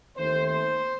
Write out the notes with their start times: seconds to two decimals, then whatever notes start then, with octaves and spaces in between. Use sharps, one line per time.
0.17 D#2 D#3 A3 C4 C5
0.46 C5